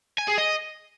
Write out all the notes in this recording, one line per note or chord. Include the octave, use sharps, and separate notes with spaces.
G#5
G#4
D#5